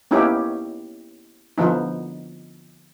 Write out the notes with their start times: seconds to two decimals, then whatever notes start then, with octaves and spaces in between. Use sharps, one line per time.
0.11 A#3 B3 C#4 D#4 E4 G4
1.58 D3 F3 B3 D#4